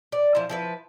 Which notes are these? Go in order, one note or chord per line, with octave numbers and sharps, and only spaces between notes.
D5
F3 E4
F3 E4 B4